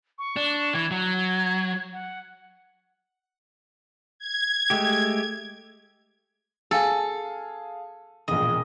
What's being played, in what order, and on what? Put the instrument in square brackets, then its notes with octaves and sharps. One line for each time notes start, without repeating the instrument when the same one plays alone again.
[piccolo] C#6
[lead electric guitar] D4
[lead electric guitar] E3 [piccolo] G#6
[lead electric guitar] F#3
[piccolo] F#5
[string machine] G#6
[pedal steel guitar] G#3 A3 G4
[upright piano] G#4 F5 G#5 [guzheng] A4
[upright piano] E1 A#1 [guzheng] D#5